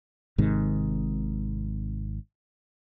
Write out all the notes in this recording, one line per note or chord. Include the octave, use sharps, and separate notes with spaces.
G#1 G#2 C3 D#3